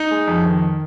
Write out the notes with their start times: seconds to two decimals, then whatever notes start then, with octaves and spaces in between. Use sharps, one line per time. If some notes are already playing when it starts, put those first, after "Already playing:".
Already playing: D#4
0.11 G#3
0.27 F2
0.45 D#3